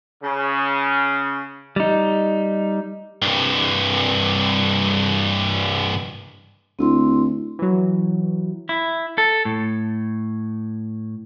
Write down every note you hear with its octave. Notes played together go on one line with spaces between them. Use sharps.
C#3
G3 D#4
C2 G2
D2 C4 E4 C6
E3 F#3
E4
A4
A2